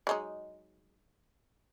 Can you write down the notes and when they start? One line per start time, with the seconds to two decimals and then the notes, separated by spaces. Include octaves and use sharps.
0.07 F#3 G#3 D#4